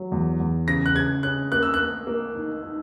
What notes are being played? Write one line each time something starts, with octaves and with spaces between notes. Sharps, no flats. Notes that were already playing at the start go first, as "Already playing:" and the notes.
Already playing: F#3
E2
E2
C#3 A#6
F#6
C#3 G#6
C#4 F#6
A#3 F#6
E6
F#6
A#3
A#3
D#4
D#4